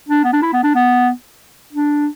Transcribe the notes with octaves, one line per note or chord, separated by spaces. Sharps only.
D4
B3
D4
E4
B3
D4
B3
D4